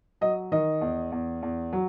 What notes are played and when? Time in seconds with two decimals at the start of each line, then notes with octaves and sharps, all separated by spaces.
0.21 F#3 D#5
0.52 D#3 D#5
0.81 E2
1.12 E2
1.43 E2
1.73 F#3